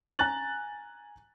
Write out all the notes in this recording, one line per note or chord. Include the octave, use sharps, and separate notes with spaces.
G#5 A#5 F#6 A6 F#7